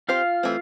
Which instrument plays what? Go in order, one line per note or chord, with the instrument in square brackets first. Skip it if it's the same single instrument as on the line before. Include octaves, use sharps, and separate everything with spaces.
[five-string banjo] C4 G4 C5 [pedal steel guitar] F4 F5
[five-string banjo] E3 A3 C4